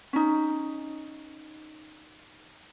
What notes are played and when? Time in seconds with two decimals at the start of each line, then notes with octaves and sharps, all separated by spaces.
0.13 C#4 D#4